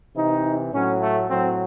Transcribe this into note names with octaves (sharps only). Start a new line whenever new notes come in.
C3 E3 D#4
A2 F#3 C#4
A3
A2 F#3 C4